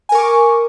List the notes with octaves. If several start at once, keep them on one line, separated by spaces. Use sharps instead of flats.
A#4 G#5 C#6 D6